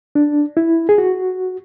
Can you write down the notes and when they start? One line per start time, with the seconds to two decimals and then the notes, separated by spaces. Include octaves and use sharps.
0.15 D4
0.57 E4
0.89 G#4
0.98 F#4